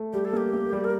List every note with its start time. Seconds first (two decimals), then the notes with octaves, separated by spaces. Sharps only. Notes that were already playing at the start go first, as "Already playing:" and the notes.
Already playing: A3
0.13 G3 G4
0.25 A4
0.33 A#3 G4
0.53 A#3
0.73 G3
0.84 A#4